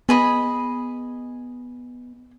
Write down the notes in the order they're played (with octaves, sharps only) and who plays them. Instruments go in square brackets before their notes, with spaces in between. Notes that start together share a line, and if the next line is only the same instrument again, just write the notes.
[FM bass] B3 [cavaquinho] G#4 D#5 B5